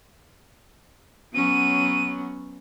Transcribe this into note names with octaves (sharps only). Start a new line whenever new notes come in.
F#3 B3 C#4 D#7